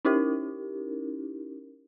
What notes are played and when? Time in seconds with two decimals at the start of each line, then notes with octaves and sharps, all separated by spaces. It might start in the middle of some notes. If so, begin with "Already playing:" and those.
0.05 C#4 D#4 E4 G4 A#4